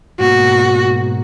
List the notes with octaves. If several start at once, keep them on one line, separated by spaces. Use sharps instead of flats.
G#2 B2 A#3 F#4